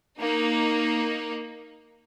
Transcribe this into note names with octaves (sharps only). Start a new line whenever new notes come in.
A#3 D#4